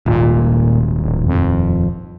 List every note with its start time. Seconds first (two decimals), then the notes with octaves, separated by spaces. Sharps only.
0.06 D#1 G#1 A#2
1.00 D1
1.26 F2